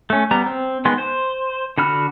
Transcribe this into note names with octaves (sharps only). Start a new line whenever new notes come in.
A3 C#4
G3 B3 A#5
C4
D#3 G#3 B3 C6
C5
D3 F#4 B5 F6